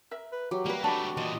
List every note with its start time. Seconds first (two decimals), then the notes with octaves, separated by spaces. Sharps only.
0.11 A#4 E5
0.32 B4
0.51 F#3 G4
0.66 G3 A#3 B4
0.84 A3 D4 F#4 G4 A5 B5
1.17 A#2 E3 F4 D#5